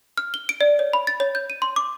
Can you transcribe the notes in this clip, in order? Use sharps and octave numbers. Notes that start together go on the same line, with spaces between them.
F6
G7
D7
D5
C#5
B5
A6
C#5
G6
D#7
C6
D6